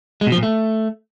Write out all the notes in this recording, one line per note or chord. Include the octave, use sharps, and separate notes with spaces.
G#3
B2
F3
A#2
A3